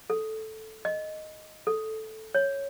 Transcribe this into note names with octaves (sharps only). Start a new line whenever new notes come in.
A4
D#5
A4
C#5